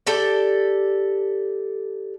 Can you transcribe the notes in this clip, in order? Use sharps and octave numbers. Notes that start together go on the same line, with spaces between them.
G4 A4 D5